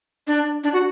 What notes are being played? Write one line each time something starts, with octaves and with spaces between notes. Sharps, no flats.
D4
D4
F#4